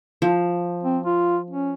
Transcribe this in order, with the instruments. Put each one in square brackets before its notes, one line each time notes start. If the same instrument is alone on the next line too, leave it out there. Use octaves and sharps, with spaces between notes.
[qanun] F3
[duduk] C4
F4
C#4